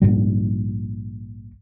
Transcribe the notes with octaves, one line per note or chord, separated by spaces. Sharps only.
A#1 G#2 G3